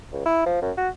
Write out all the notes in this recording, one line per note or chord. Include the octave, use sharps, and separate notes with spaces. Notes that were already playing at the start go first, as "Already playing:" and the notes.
C#2
E4
F3
F#2
F#4